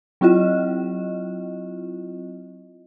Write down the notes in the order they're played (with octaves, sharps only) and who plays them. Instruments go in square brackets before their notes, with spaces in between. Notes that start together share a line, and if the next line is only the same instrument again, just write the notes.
[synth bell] F#3 C4 E4 F4 D#5